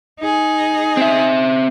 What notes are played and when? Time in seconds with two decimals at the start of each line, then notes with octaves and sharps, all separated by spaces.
0.20 D#4 G#4
0.97 C4 E5